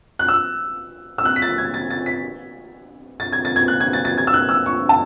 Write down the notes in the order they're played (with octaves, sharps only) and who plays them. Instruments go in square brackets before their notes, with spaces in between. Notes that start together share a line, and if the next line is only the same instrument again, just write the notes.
[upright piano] F#6
E6
E6
F#6
B6
A6
G#6
A6
A6
B6
A6
G#6
A6
G#6
F#6
G#6
A6
A6
G#6
E6
F#6
E6
C#6
A5